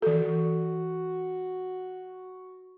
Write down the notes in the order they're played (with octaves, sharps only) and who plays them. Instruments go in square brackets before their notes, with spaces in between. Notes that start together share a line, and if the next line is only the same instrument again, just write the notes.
[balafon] E3 A4 [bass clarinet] F#4